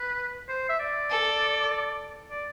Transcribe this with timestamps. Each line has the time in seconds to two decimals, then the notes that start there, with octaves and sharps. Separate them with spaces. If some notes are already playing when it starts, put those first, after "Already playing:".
Already playing: B4
0.49 C5
0.69 E5
0.79 D5
1.10 A4
2.31 D5